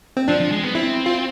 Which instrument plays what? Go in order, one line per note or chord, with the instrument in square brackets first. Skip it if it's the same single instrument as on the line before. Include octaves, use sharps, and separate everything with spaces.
[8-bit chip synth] C4
[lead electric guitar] F3 [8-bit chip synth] D4
[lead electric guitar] F3
G#3
B3
[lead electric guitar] C4 [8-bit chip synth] E4
[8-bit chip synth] F4